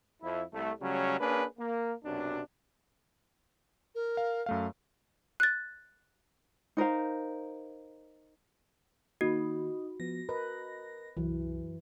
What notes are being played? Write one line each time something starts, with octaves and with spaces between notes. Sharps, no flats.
F2 E4
C2 A3
C#3 F#3 G3 A3 C#4
A#3 C#4 D4 G#4 B4
A#3
B1 F#2 C3 D4
A#4
F5
F#2 A3 F5
F#6 A6
D#4 A#4 C5 F5
D#3 A#3 D#4 F#4
F3 B3 A#6
A#4 B4 D#5
C2 F#2 E3